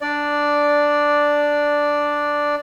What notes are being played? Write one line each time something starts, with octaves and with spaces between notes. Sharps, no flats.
D4 D5